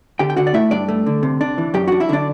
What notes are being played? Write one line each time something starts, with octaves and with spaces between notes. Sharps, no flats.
D3 G4 G5
G5
D3 F#4 F#5
D5
A3 E4 E5
G2 D4 D5
A3
D3
C3
D4
E3
F#2 G4 G5
D4 F#4 F#5
E4 E5
D3 D4 D5